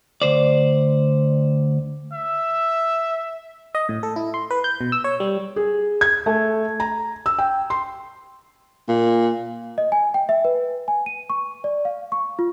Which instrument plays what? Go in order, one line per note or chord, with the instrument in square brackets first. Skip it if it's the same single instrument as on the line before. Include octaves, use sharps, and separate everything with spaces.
[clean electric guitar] D2 C5 D5
[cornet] E5 [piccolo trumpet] E6
[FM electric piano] D#5
A2
A4
E4
C6
B4
G6
B2
E6
C#5
G3
[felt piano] G#4
G#6
A3
A#5
E6
G5
C6
[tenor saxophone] A#2
[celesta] D#5
G#5
G5
E5
B4
G#5
D#7
C#6
D5
F5
C#6
F4